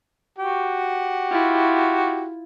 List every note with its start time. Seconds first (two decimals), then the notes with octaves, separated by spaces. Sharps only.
0.38 F#4 G4
1.31 E4 F4